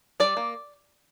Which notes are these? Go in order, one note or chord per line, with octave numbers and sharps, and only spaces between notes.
G3 D5
A#3